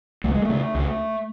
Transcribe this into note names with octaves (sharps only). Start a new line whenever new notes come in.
C#2 A3
G#3
C#3 A3
C#2